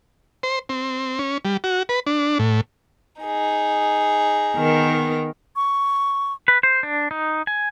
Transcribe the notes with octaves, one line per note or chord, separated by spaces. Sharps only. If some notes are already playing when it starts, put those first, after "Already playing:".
C5
C4
C#4
G3
F#4
B4
D4
A2
D#4 G#4
D#3 B3 A#4
C#6
B4
C5
D4
D#4
G#5